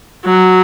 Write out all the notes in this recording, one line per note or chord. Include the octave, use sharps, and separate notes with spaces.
F#3